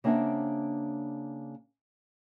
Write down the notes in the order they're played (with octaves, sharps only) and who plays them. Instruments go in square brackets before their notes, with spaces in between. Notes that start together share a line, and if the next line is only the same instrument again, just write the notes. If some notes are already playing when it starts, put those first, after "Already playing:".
[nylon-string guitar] C#3 A#3 C4 D4 E5 F#5